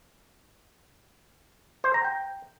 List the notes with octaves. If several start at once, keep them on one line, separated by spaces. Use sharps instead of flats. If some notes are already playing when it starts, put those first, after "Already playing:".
C5
A#5
G5